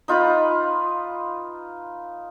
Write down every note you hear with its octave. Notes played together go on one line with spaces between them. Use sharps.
D#4 F4 B4 B5